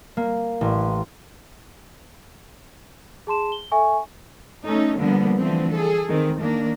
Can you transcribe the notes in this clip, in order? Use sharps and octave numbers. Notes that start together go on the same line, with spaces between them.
A#3
A1
G#4 A5 C6 E7
G7
A4 E5 G#5 C#6
A3 C#4 D#4 A4
D3 F3 G3 A#3 B3
D3 E3 F3 A3 C4
G#4 A4
D#3 C4
D#3 A#3 D4